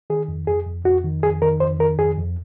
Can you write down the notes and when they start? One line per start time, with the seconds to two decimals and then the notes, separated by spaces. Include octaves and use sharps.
0.10 D#3 G#4
0.28 F2
0.47 F2 G#4
0.67 F2
0.85 F2 F#4
1.04 D#3
1.23 F2 G#4
1.42 D#3 A#4
1.60 F2 C5
1.80 D#3 A#4
1.98 F2 G#4
2.18 F2